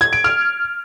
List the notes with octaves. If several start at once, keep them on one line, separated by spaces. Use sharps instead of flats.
G#6
D7
F6